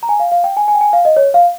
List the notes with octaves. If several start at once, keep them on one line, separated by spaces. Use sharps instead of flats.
A#5
G#5
F5
F5
G5
G#5
G#5
G5
G#5
F5
D#5
C#5
F5